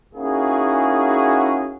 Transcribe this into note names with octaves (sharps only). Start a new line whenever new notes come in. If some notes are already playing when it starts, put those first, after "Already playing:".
A#3 C#4 D#4 E4 F#4 G#4